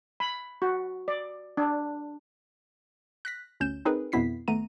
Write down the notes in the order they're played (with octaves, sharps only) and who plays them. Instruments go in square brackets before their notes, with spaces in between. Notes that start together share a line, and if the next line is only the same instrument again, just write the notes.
[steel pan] B5
F#4
D5
D4
[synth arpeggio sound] F#6 A#6 B6
G1 D2 C#4 G6 E7
C4 D#4 G#4 A#4 B4
F2 B2 B3 E4 B6 C7
G#1 A3 B3 A#5 D#7